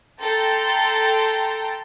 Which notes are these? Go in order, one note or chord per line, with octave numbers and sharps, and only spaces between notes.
A4 G5 A5 A#5 C6